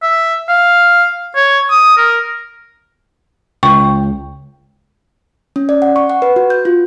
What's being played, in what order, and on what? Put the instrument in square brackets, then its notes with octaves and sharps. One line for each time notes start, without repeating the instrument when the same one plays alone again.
[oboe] E5
F5
C#5
D#6
A#4
[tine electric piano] C#2 [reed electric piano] G5 [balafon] C#6
[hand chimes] C#4
D5
F#5
C#6
F#5
B4
F#4
G6
F4